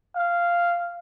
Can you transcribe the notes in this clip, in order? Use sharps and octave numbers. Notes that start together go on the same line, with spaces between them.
F5